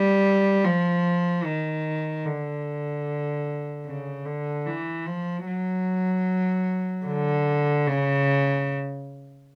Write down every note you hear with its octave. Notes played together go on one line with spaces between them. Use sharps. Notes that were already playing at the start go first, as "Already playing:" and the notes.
Already playing: G3
F3
D#3
D3
C#3
D3
E3
F3
F#3
D3
C#3